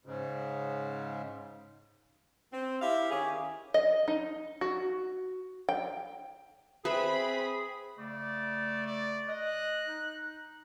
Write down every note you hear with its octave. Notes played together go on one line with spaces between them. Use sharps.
G#2 C#3
C4
E4 G4 E5 F5
D#3 C#4 G4 G#4
D#5
D#4
F#4
G5
C4 G#4 B4 E5 B5
C#3 A3 D5
D5
D#5 F#6
D#4